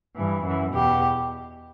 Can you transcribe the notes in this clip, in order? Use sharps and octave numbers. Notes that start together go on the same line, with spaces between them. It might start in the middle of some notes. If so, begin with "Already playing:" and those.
G2 E3
F#2 E3
E2 B2 G4